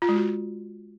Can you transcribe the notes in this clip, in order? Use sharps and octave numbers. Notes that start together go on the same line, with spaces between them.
F4
G#3
F#4